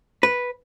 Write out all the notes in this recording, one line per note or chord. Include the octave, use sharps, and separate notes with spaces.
B4